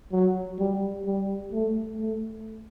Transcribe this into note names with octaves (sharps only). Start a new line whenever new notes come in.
F#3
G3
G3
A3
A3